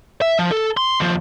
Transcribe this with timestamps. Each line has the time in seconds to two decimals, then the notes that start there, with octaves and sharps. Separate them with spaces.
0.21 E5
0.39 F3
0.51 A4
0.77 C6
1.00 D#2 F3